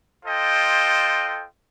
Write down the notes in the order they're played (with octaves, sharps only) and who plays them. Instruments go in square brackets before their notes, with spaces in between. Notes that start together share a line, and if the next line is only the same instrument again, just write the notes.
[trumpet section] F4 A4 C5 D#5 G5